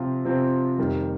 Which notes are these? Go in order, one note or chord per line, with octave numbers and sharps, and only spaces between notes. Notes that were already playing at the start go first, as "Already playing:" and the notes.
Already playing: C3 F3 C4 F4
C3 F3 C4 F4
F1 F2 D#3 G3